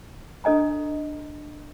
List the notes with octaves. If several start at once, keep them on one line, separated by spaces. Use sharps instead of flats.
D4 A4 D#5 G#5 A#5